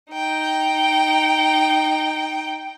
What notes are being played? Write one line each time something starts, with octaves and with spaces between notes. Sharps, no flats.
D#4 G5